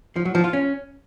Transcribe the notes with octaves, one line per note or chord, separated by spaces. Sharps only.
F3
F#3
F3
F4
C#4